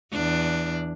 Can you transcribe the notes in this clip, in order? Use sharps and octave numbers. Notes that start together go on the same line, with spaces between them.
E2 D4